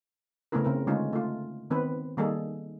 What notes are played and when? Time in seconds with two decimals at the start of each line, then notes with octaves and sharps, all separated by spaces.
0.52 C#3 A3 B3 C#4 E4 A#4
0.65 C#3 C4 A#4
0.87 D3 G#3 A3 C#4 D#4 F4
1.13 A3 F4
1.70 D#3 B3 C4 B4
2.17 D#3 G3 A#3 D#4 G#4 A4